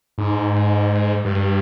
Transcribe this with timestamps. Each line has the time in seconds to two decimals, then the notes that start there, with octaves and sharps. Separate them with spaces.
0.18 G#2
1.25 G2